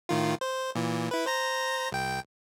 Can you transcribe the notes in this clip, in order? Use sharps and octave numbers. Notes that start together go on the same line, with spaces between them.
A2 D#3 F4
C5
A#2 E3
E4 B4
C5 A#5 A#6
C2 G5